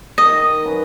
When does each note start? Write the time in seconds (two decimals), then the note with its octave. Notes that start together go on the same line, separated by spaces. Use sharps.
0.18 D#3 D#5
0.64 F#3 C#4 B4